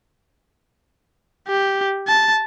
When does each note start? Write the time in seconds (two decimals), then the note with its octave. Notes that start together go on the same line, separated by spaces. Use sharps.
1.48 G4
2.08 A5